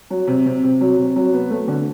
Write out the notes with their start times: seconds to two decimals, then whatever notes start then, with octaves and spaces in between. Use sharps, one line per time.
0.10 F#3
0.27 C3
0.46 C3
0.63 C3
0.81 F#3
0.98 C3
1.16 F#3
1.33 B3
1.51 A3
1.68 D3